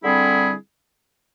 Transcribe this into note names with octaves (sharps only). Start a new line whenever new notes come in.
D3 G3 C4 E4 G#4